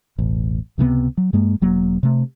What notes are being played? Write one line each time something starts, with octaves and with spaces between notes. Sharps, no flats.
E1 A1
C#2 C3 D#3 B3
F#3
G2 G#3 A#3
E1 F#3 A#3
C3 A3